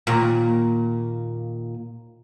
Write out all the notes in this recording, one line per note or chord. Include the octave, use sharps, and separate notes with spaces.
D#2 A#2